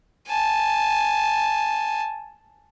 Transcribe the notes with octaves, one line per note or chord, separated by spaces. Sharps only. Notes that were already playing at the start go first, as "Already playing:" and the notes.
G#5 A5